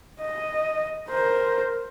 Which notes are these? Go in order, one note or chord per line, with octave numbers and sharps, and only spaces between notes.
D#5
A#4 C5